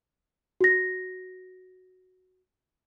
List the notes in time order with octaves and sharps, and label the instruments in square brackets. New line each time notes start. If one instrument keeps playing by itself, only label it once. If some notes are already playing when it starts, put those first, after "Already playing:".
[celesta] F#4 A#6